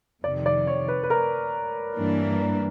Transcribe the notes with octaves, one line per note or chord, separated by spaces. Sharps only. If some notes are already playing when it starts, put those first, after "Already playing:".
F2 C3 D#3 D5
D5
C#5
B4
B4
A#4
G2 E3 G3 A#3 D4